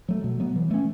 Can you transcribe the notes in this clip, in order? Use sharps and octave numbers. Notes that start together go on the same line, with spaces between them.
F#3 A3
B2
F#3 B3
E3
A3 C#4